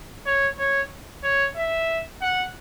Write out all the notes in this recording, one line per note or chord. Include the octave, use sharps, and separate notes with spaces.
C#5
C#5
C#5
E5
F#5